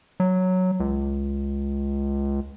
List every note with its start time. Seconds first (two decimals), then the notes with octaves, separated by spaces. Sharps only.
0.20 F#3
0.80 C#2